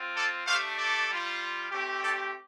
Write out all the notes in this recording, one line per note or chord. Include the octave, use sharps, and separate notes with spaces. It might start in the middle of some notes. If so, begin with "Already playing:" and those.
Already playing: C4 F4
A4 D5
A3 D4 G4 C5 F5
A4 D5
G3 F4
A3 C4 G4
A4 D5